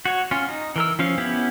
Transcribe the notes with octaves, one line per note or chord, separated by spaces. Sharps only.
F#4 C#5
C#4 F4
D#4
E3 A#4 E6
F3 C#4 F5
B3 C#4 E4 G4